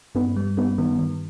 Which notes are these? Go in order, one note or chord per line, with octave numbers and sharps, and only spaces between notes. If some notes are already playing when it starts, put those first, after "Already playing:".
G2 B3
G3
G3 B3
D#3 B3
D#3